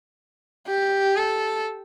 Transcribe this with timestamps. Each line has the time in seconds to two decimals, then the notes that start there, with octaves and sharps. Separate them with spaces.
0.68 G4
1.17 A4